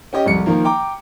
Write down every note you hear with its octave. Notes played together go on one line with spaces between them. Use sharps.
C#4 G4 D#5
C2 F2 C#7
D#3 F3 A#3
G5 A#5 D6